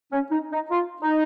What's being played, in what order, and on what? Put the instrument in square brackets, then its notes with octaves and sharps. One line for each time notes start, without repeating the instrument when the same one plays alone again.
[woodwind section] C#4
D#4
D#4
F4
D#4